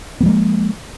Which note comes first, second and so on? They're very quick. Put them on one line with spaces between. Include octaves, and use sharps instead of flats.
B3 F3 G#3 A#3